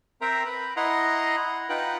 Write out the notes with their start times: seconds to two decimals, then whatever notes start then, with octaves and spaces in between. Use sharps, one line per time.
0.21 C4 A#4 C5 E5 G5 A#5
0.45 B4 B5
0.77 E4 D#5 F#5 A#5 C6
1.69 D#4 F4 B4 F#5 G5 F#6